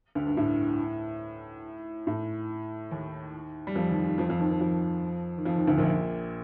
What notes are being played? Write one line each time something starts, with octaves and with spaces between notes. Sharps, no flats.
D2 D3
G2
A2
A2
D#2 D#3
G3
F2 F3
D#2 D#3
D#2 D#3
F2 F3
F2 F3
D#2 D#3
D#2 D#3
F2 F3
D#3
F2 F3
D#2 D#3
D2 D3
A#1 A#2